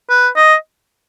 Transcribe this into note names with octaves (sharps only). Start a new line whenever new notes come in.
B4
D#5